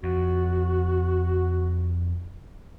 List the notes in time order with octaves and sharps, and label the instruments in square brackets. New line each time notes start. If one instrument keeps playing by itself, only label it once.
[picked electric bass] F2 [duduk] F#4